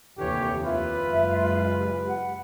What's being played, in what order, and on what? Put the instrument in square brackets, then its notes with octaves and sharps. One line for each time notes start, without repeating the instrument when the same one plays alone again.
[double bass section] F1 D#2 [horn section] D3 E3 C#5 [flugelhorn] G4
[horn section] F4 [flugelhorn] B4 [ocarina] E5
[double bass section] F#1 G#3
[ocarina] G4
F#5